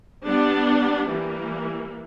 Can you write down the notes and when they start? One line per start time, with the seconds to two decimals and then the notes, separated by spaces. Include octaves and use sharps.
0.25 G3 B3 D4
1.08 E3 G3 A#3